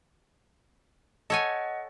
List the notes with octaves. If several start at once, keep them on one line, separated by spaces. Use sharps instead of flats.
A4 C#5 D#5 F#5 G#5